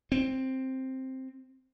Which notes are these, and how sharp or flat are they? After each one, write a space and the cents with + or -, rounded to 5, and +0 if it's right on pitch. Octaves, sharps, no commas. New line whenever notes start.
C4 +5